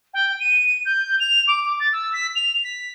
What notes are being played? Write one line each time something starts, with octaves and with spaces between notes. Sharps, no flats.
G5
D#7
G6
F7
D6
A6
E6
B6
F7
B6